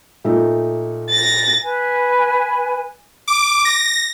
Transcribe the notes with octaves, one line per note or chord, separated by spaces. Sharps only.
A#2 A3 D#4
A6 A#6
B4 G#5
D6
A#6